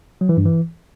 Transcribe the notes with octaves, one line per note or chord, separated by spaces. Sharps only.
F#3
E3
G2
E3